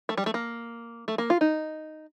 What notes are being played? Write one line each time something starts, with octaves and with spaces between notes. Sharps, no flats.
A3
G3
A3
A#3
A3
A#3
F4
D#4